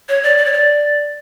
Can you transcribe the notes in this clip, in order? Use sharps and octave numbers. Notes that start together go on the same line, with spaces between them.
C#5
D5
D5
C#5
D5